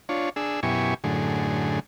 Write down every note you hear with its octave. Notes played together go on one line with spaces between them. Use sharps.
D4 F4 C#5
D4 G#4 E6
F#2 B2 E4 G4 G#5 C#6
F#2 A2 D3 G#4